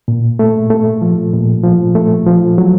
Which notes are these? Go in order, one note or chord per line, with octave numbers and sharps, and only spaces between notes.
A#2
A3
A3
F3
A#2
F3
A3
F3
F#3